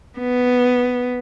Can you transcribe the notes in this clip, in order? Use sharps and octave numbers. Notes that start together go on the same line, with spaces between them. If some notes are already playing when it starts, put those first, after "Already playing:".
B3